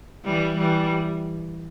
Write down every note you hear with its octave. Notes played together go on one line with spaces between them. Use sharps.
E3 G3
E3 G3